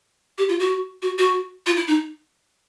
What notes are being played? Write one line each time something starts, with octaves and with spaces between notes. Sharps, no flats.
G4
F4
F#4
F#4
F#4
F4
E4
D#4